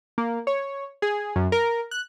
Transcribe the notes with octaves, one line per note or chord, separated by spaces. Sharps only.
A#3
C#5
G#4
F#2
A#4
F#6